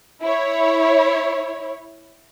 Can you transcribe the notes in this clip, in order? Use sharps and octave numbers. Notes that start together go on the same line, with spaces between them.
E4 C#5